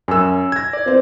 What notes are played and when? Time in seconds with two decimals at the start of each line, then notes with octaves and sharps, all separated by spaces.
0.08 F#2 G#5 E6
0.52 G#6 A#6
0.73 D5
0.86 C4 C5